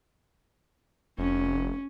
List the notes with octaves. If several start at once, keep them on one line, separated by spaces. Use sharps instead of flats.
F1 C#4